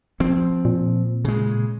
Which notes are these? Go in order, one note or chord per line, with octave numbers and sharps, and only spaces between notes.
F3 C4
A#2
C#3 G#3